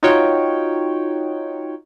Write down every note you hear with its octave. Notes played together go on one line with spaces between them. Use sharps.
D#4 F4 F#4 C#5 G5